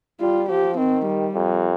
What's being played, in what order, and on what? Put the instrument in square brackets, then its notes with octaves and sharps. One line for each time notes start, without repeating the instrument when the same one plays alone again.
[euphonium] G3 [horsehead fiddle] F4
[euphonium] F3 [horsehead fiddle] G4
[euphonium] D#3 [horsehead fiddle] C4
[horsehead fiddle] G3
[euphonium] F2